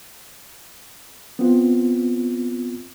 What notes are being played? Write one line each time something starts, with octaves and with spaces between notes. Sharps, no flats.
B3 C4 F4